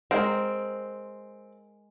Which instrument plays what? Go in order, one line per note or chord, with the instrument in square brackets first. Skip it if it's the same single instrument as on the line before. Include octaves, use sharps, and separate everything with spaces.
[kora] G#3 A#4 [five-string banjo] C4